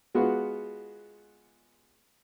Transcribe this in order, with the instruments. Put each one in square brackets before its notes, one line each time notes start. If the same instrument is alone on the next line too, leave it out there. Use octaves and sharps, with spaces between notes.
[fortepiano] G#3 B3 F4 F#4